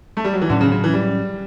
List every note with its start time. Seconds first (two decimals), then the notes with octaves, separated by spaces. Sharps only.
0.17 A3
0.24 G3
0.33 F#3
0.41 E3
0.49 A2 D3 F#3 C#4
0.61 C#3
0.72 C#3
0.84 E3
0.94 G3